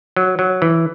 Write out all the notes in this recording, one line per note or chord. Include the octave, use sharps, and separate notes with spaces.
F#3
F#3
E3